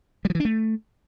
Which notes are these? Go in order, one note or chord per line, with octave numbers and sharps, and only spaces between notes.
G3
F3
E3
D4
A3